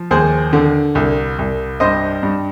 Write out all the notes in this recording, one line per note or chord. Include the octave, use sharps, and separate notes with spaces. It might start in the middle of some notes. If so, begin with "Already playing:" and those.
Already playing: F3
D#2 G#4 C5
D3
C2
C2
G2 C5 D#5
G2